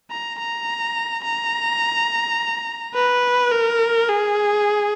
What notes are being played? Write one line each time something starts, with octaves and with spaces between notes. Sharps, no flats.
A#5
A#5
A#5
B4
A#4
G#4